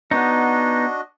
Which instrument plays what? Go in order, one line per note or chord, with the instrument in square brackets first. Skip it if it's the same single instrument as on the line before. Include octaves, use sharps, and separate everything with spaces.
[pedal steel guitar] B3 D#4 [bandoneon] D4 F#4 D#5